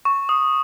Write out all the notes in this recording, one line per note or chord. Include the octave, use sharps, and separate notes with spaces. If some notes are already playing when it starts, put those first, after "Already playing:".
C#6
D#6